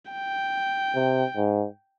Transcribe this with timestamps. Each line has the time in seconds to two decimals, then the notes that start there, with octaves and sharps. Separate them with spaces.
0.12 G5
0.95 C3
1.37 G#2